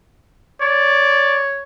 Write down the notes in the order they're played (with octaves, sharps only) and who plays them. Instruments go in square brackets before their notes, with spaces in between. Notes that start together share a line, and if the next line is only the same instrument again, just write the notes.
[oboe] C#5 [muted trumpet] D5